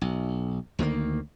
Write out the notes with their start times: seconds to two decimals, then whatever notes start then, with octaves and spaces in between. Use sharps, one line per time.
0.01 B1
0.79 D2 D#3 G3 A#3